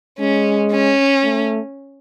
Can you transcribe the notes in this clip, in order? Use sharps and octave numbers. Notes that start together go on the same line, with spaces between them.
G#3 C#4
C#4
A3